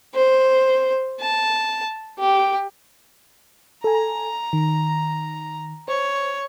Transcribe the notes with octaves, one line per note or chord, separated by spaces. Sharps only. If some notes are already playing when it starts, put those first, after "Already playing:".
C5
A5
G4
A4 G#5 A#5
D#3
C5 C#5